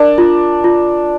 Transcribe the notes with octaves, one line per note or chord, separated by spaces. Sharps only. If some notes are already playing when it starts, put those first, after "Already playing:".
Already playing: D4 A#4
F4
F4